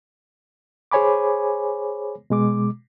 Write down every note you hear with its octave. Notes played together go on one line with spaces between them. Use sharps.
G#4 C5 C#5 G#5 B5 D6
B2 G#3 D6